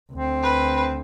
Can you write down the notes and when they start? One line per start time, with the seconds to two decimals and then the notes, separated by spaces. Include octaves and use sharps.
0.12 D2 C4
0.43 B4